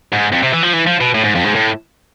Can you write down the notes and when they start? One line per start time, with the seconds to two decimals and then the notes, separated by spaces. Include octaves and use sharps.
0.12 G#2
0.32 F2
0.43 C3
0.53 E3
0.63 F3
0.73 E3
0.87 F3
1.01 B2
1.14 A2
1.24 G#2
1.35 F2
1.44 G#2
1.55 A2